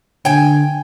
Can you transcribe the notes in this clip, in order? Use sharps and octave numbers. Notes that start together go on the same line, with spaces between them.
D3 G5 G#5